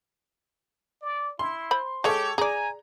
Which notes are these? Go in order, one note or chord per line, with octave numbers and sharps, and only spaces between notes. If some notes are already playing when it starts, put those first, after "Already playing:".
D5
E4 C6
C5 B5
G#3 G4 A4 C#5
G#4 D5 G#5 A#5